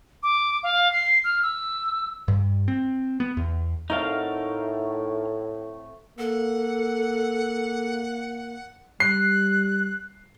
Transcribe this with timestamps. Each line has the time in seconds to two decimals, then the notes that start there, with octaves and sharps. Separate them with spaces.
0.23 D6
0.63 F5
0.92 C7
1.24 F6
1.43 E6
2.28 G2
2.68 C4
3.20 B3
3.37 E2
3.90 A2 A3 C4 D#4 F#4 A#4 F5
6.19 A#3 A4 F#5
9.00 G3 F#6 C7